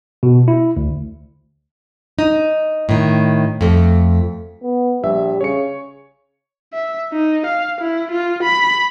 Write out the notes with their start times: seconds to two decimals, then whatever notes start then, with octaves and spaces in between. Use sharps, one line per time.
0.23 B2
0.48 E4
0.77 D2
2.19 D#4
2.89 A2 D#3
3.61 F2 A3
4.62 B3
5.03 A#1 G3 E5
5.41 C#3 C#5 C#7
6.73 E5
7.13 D#4
7.46 F5
7.81 E4
8.12 F4
8.43 B5